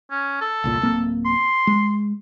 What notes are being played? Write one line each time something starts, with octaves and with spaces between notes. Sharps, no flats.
C#4
A4
E1 C2 A#2
D1 A#3 C4
C6
G#3